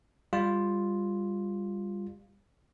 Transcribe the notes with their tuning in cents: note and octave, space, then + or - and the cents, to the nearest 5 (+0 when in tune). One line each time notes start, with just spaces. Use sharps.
G3 +25 F4 +0